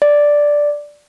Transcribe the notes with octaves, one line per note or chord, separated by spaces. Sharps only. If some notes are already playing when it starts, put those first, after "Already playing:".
D5